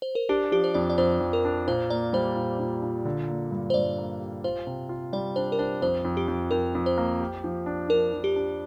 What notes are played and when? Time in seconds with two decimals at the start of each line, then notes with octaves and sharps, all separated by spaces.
0.02 C5
0.15 A#4
0.29 D4 G4
0.52 F3 G4
0.64 C5
0.74 F2 D5
0.90 D5
0.98 F2 C5
1.20 F2
1.33 A#4
1.45 D4
1.68 A#2 C5
1.90 A#3 D5
2.13 G3 C5
2.36 A#2
2.59 A#2
2.83 A#2
3.05 D3
3.28 A#3
3.51 G2
3.70 C5
3.74 G2 D5
3.98 A#3
4.20 G4
4.44 F4 C5
4.67 C3
4.89 F4
5.13 G3 D5
5.36 D4 C5
5.52 A#4
5.59 D4 C5
5.82 F2 C5
6.05 F2
6.17 G4
6.28 F2
6.51 F2 A#4
6.75 F2
6.86 C5
6.98 A#3
7.20 G4
7.44 F3
7.66 D4
7.89 F3 A#4
8.13 F3
8.24 G4
8.36 D4